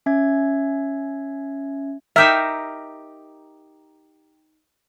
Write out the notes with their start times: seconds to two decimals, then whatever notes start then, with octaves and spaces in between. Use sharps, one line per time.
0.06 C#4 E5 G#6
2.16 D#4 G4 A#4 E5